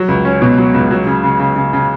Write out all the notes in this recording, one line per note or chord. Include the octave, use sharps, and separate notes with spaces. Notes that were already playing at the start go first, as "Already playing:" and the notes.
Already playing: F#3
C#2
C#4
B2
F#3
C#2
F#3
C#3
C#3
C#3
C#3
C#3